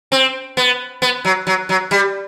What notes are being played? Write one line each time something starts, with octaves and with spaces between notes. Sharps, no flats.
C4
B3
B3
F#3
F#3
F#3
G3